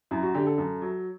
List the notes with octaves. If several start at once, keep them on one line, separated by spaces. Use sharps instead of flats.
F#2 E4
F#4
D3 G4
A4
F#2
F#3